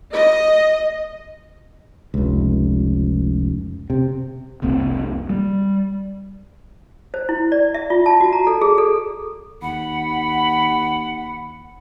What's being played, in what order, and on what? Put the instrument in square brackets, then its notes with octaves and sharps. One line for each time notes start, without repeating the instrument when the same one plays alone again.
[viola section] D#5
[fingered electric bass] F1 C#2
C3
F1 C2 A#3 C4
G3
[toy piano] C5
E4
D5
E5
F4
A5
F#4
A#5
A4
G#4
A4
[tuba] D#2 [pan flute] F#5 [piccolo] B5